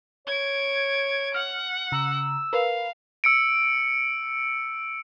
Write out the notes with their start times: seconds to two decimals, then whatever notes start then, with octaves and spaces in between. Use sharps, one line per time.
0.27 C#5 G#6 D7
1.34 F#5 F6
1.92 C#3 A#5 E6
2.53 A#4 B4 F5
3.24 E6 C#7 D7